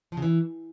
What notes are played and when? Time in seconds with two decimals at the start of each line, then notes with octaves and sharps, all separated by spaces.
0.12 F3
0.17 C#3
0.22 E3